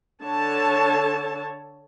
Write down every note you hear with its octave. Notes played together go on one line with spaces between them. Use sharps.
D3 C#5 A5